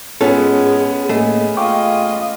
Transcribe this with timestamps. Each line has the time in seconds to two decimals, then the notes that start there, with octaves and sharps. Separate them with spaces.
0.21 G#2 G#3 B3 C#4 F4 G#4 A4
1.09 A2 A3 A#3 G#4 D#5
1.57 F4 D#5 G5 C#6 D6